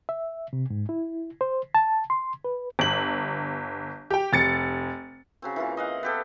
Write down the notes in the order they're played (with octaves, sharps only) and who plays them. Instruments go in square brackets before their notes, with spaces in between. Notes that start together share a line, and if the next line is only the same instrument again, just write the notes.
[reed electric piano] E5
C3
G#2
E4
C5
A5
C6
B4
[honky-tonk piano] G1 F#7
G4 G5
F1 A6 C#7
[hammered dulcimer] C#3 F#3 C4
E3 A#3 F4
D#5 F5 F#5
B3 G4 A4